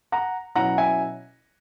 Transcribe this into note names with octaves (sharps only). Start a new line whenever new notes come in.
F#5 A#5
B2 F#3 C#4 E4 F#5 A#5
E5 G#5